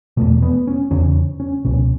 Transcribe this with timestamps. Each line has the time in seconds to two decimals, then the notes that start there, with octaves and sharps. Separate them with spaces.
0.17 E2 B2 A3
0.42 B3
0.67 C#4
0.91 E2 C#3 C#4
1.40 C#4
1.65 C#2 B2 C#4